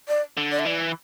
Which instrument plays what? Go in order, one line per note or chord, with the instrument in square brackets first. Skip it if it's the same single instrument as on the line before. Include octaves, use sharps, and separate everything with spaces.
[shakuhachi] D5
[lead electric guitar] D3
[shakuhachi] D5
E5
[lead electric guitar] E3 [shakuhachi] D5